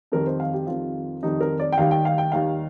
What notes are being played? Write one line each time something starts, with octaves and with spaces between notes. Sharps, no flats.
F2 D#3 G3 A#4
C5
F5
G4
F2 D#3 G3 F4
F2 D#3 G3 D#4
A#4
D5
G5
D#2 D#3 G3 F5
G5
F5
G5
D#2 D#3 G3 F5